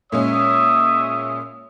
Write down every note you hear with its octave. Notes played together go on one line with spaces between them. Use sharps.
A#2 G#3 C#4 C#5 E5 D#6